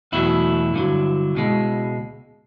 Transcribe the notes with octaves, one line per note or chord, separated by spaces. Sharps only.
E2 B2 F#3 A3 E4
G2 D3 F#3
C#2 B2 G#3